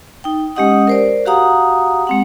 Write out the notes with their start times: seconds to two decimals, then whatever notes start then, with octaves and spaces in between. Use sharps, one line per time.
0.24 D#4 G5
0.56 G#3 C#4 G4 D#5 F#5 D#6
0.87 A#4 C5 D5
1.25 F#4 G4 F5 F#5 A#5 D#6
2.07 G#3 C4 F#5